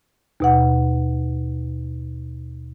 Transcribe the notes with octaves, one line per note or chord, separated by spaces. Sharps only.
D#2 B2 F#5